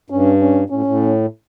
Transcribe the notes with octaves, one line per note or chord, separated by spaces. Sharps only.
G2 C#4
C#4
A2 C#4
A2